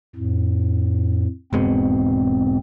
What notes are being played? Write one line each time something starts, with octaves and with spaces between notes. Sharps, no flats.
F2 A2
E1 G#2 B2 C4